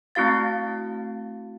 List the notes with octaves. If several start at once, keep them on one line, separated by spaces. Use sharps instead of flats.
A3 C4 E4 F#4 F5 A6